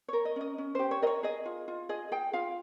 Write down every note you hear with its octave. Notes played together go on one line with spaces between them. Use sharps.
A#4 C#5
D#5
C#4 D#5
C#4
G4 C5
C#5
A#4 C#5 D#5
G#4 D#5
F4
F4
G#4 D#5
G#4 G5
F4 F5